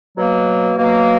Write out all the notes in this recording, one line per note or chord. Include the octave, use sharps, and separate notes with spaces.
B2 F#3 A#3
B2 F#3 A#3